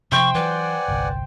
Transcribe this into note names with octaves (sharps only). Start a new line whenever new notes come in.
C3 F3 C5 G5 C6 C#6
E3 F#3 B4 D5 F#5 G#5
G1 C2